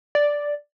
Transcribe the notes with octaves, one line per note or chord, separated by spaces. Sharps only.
D5